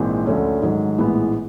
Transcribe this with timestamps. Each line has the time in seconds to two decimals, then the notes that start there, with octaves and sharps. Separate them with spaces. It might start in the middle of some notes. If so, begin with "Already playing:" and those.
Already playing: A#1 G#2 E3 G#3 C4
0.26 D2 D3 F3 A3 C#4
0.62 G#2 D#3 F#3
0.97 A#1 A2 E3 G#3 B3